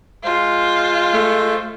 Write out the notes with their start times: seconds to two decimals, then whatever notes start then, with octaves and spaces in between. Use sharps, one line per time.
0.24 G#3 F4 C5
1.13 A3